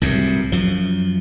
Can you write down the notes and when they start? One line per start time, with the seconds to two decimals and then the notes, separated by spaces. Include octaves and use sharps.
0.01 C2 F#2 A2
0.52 F#2 F3